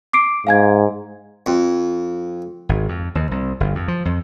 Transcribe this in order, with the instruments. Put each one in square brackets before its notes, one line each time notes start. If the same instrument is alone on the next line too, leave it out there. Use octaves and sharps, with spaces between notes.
[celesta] D6 C7 D7
[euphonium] G#2 [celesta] F5 G#5 G#6
[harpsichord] F2
[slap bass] G#1
F2
D#2
C2
G1
F2
F3
F2